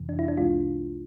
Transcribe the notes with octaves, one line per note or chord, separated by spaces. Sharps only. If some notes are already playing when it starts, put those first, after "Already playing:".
Already playing: F2 C3 E3
D4
E4
D4
C2 C3 G#3 F4